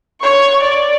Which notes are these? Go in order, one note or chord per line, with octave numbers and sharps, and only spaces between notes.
C#5 C#6
D5